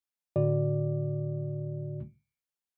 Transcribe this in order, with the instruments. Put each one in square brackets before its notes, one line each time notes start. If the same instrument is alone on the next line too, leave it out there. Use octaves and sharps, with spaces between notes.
[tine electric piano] A2 D3 F#4 D5